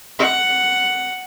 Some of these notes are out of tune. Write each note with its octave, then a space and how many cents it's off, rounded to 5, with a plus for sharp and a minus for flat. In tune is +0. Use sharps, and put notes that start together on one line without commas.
F#5 +5